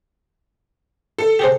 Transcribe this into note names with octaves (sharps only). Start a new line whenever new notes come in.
A4
G4 G#4 C5